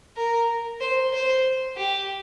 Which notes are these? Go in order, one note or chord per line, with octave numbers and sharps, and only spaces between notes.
A#4
C5
C5
G4